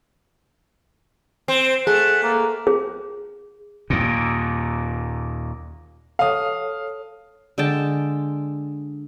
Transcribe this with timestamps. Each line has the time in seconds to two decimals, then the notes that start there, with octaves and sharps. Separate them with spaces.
1.48 C4
1.87 A3 G#4 F#5
2.23 A#3
2.67 G#4
3.90 D#2 A#2
6.19 A4 C#5 F5 D#6
7.58 D3 G#3 G5 A5